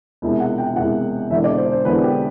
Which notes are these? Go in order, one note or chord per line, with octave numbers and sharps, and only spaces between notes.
E1 E2 C3
F#5
G5
E1 E2 C3 F#5
E1 E2 D3 E5
D5
C5
C5
E1 E2 D3 B4
G4